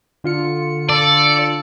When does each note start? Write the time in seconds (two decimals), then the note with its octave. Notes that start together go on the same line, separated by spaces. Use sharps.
0.24 D3 F4 C#7
0.89 A4 D5